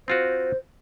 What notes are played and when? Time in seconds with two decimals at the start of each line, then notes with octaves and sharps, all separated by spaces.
0.08 C4 F4 F#4 C5